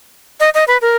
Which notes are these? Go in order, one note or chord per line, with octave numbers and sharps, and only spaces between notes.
D#5
D#5
B4
A#4